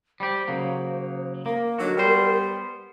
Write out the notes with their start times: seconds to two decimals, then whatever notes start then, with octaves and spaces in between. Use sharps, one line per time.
0.20 G3 G4 C5
0.48 C#3 F#3 A#3
1.46 A#3 A#4
1.78 D3 D#3 F#3 F#4
1.97 G3 B3 C5